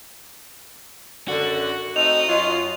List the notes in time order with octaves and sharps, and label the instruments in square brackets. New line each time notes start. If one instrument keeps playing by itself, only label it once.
[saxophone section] F#2 D3 [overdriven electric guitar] F#4
[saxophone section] A3 C4 D#4 [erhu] D#5 [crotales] F7
[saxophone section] F#2 F#3 F4